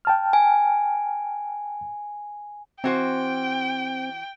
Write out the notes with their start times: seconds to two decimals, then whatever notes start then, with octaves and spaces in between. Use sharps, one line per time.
0.05 G5 A5 F6
0.33 G#5
2.84 E3 C4 F#4 C5 G5